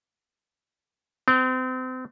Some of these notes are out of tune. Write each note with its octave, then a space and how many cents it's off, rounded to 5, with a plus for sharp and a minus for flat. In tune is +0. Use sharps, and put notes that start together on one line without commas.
C4 -35